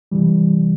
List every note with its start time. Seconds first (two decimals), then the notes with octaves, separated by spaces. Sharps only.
0.12 C3 E3 G3